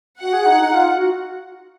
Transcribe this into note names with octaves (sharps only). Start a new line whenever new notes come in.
F#4 F#5
G#4
D#4
D#4
F4
F#4